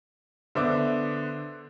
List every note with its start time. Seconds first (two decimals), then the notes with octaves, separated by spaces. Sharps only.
0.55 D3 B3 C5 E5 D6